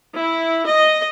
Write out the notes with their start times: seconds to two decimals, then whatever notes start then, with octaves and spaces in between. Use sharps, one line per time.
0.16 E4
0.68 D#5